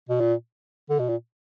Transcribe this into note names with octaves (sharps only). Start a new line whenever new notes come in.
B2
A#2
D3
B2
A#2